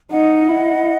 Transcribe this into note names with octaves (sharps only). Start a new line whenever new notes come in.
D#4 D#5 F#5
E4